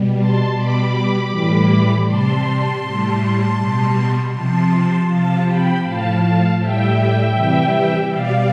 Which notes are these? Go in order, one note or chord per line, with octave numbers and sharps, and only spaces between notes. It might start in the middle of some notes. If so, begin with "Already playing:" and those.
Already playing: B2 G3
A5 C6
B2 G3 B5 D6
A2 E3 G3
C3 G3 A5 C6
A2 G3
B2 G3
C3 F3 A5 C6
C3 F3 F5 A5
G5 B5
A2 F3 F5 A5
A2 G3 E5 G5
C3 E3 G3
B2 G3 D5 F5